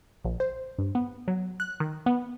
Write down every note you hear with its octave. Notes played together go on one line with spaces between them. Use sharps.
A#1
C5
G2
B3
F#3
F#6
D#3
B3